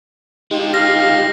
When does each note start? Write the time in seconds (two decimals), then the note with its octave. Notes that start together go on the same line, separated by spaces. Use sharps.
0.51 G#3 D#4 F4 G4
0.74 F5 A#6